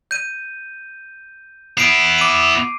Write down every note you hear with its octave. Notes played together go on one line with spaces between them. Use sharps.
G6 D#7
B3 E4 C7 D7 D#7
D6 D#7